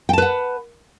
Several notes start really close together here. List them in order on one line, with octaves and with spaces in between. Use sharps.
G5 A5 B4 F#5